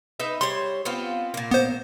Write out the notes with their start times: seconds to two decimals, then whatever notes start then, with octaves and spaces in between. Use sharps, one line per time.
0.20 D#4 B4 E5
0.41 G3 C5 C#5 C6
0.85 B3 C4 F4
1.34 A#2 A#3
1.51 B3 C5